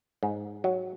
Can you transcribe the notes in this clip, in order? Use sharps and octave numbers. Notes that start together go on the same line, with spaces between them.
G#2
F#3